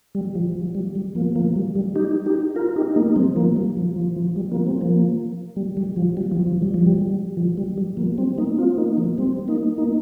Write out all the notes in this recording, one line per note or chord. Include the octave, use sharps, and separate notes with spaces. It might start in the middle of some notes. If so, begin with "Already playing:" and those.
G3
F3
F3
G3
G3
F3 A#3
F3 A#3
G3
G3
D#4 G4
D#4 G4
F4 A#4
D#4 G4
A#3 D#4
G3 C4
F3 A#3
G3
F3
F3
F3
G3
F3 A#3
G3 C4
F3 A#3
G3
G3
F3
G3
F3
F3
G3
F3
G3
F3
G3
G3
F3 A#3
G3 C4
A#3 D#4
C4 F4
A#3 D#4
F3 A#3
G3 C4
A#3 D#4
A#3 D#4